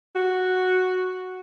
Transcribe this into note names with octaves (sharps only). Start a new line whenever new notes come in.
F#4